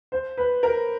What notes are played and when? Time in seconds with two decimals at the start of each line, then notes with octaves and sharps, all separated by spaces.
0.12 C5
0.37 B4
0.63 A#4